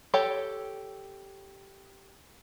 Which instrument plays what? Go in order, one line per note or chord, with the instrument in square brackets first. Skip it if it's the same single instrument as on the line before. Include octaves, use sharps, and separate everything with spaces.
[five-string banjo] G4 A4 C#5 G5